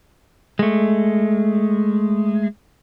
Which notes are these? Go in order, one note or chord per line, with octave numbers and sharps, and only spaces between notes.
G#3 A3